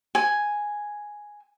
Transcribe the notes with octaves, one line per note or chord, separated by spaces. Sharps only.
G#5